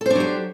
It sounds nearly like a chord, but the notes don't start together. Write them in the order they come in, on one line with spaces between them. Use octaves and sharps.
A4 C5 D4 F#3 G4